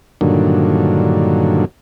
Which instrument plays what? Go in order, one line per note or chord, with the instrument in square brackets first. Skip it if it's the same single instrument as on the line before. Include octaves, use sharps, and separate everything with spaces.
[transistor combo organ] G2 A#2 D3 D#3 F#3